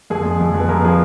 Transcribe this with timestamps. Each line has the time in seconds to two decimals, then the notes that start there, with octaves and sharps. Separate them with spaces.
0.10 F2 G#4
0.26 F2
0.41 F2
0.54 F2
0.60 B4
0.69 F2 A#4
0.84 F3 G#4